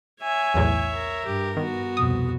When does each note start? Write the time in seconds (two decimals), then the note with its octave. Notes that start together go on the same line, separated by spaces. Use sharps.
0.22 C#5 E5 G#5
0.54 B1 E2 A2
0.94 A#4
1.25 G2 G4
1.57 D#3 B3 F#4
1.97 C2 F2 B2 D#6